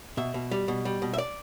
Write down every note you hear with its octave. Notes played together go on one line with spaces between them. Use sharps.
B2 E5
B2
G3
B2
G3
B2
E5
D5